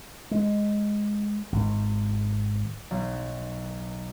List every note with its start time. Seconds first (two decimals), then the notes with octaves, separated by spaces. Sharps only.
0.31 G#3
1.52 G#1
2.91 B1